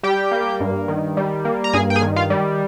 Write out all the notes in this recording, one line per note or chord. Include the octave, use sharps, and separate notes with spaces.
G3 G4 G5
A#3
G2
D#3
G3
A#3
A#5
G2 G#4 G#5
G5
G#4 G#5
D#3
F4 F5
G3